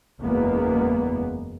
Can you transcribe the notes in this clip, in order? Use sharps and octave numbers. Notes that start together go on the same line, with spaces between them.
F#1 E2 G#3 A#3 B3